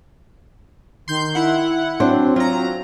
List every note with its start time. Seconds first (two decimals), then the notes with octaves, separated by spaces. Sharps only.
1.08 D#3 C6 G6
1.35 E4 F#5
2.00 F#3 C4 D4 C5
2.36 F#3 F4 A#5